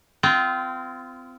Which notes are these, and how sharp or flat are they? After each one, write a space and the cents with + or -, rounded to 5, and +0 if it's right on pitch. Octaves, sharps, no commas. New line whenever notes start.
C4 -30 F4 -15